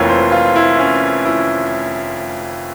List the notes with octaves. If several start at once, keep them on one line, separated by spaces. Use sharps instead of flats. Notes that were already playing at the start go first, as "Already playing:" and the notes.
Already playing: F1 F2 E3 A#3 C#5
C5
F4
E4
C#4
E4